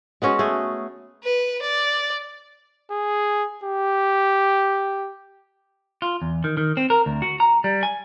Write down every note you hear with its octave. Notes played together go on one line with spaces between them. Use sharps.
G#3 B3 C#4 F#4
A3 G#4
B4
D5
G#4
G4
F4
E2
D#3
D#3
C4
A#4
D2
F#4
A#5
G3
G#5